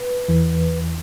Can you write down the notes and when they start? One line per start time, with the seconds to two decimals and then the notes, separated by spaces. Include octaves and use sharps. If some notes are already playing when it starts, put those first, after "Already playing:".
Already playing: B4
0.28 E2 E3